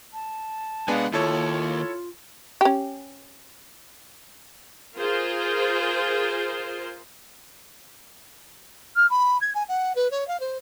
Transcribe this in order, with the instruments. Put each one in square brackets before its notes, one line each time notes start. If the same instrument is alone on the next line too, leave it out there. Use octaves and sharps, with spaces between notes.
[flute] A5
[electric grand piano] G#3 B3 D4 [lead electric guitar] F5 G#5
[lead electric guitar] D#2 [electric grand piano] E4 A4 C#5 [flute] F4
[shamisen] C#4 G4
[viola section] F4 G#4 A#4 C5
[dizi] F6
B5
G#6
G#5
F#5
B4
C#5
F5
C5